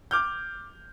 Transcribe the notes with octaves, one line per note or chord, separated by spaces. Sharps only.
D6 F6 G6